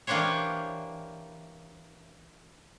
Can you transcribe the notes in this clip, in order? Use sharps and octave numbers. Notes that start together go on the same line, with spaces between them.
E3 A#3 D4 G4 C5 C#5